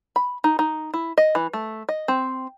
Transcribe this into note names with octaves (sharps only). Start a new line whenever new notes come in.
B5
D#4
D#4
E4
D#5
E3
A3
D#5
C4